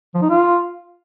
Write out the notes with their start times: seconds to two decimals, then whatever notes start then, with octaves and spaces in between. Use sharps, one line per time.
0.15 F3
0.22 D#4
0.30 F4